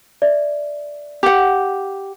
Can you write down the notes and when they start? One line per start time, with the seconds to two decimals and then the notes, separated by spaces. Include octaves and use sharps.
0.22 D5 E5
1.23 G4 F#5